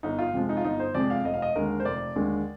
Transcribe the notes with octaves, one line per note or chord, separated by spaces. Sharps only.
G1 D#4
F4
F2 C3 F3 G#3
D#4
F4
G1 D#4
C5
F2 C3 F3 G#3 D5
F5
F1 D#5
F5
D#5
D#2 D3 G#3 A#4
C5
F1 D5
D#2 D3 G#3